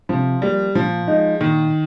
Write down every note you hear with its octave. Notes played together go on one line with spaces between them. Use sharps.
C3 F3
F3 G3 A#3
A#2 F3
G#3 D#4
A#2 D#3